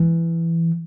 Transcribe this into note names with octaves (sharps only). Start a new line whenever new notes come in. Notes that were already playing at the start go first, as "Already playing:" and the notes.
Already playing: E3